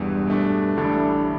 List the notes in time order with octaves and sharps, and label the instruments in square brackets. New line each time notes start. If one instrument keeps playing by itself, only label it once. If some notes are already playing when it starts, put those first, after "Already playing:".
Already playing: [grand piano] E1 E2 E3 [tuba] G2
[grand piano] B2 A3 D4
[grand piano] A1 A2 G3 D4 A4 [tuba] D3